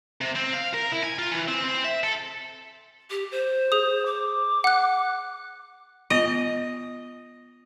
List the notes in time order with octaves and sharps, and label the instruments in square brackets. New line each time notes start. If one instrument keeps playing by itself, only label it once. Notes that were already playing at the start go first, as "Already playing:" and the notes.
[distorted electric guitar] C3
C4
F5
A#4
E4
G#5
F4
E3
C4
C4
E5
A4
[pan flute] G4
C5
[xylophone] G#4 D#6
[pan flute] D6
[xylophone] F#5 F#6
[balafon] B3 F4 [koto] D#5